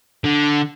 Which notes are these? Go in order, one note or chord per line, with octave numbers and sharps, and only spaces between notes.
D3